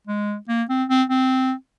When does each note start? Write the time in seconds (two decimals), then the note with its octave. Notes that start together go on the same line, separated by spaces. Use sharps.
0.07 G#3
0.49 A#3
0.69 C4
0.89 C4
1.10 C4